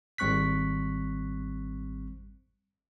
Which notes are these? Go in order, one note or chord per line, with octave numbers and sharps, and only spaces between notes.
G#1 G3 C4 C#6 F#6 B6